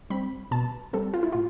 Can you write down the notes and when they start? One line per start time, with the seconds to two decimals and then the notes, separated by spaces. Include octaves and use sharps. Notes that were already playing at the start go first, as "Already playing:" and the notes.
0.10 G3 C4 B5
0.51 B2 A5
0.93 G3 C4 A4
1.14 F4
1.23 E4
1.32 A2 F4